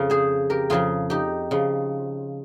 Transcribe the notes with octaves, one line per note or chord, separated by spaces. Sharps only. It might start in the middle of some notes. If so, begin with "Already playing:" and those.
Already playing: F2 C#3 F3 F5
G#4 C5
G4 A#4
F2 C#3 F3 F4 G#4
D#4 G4
C#3 F3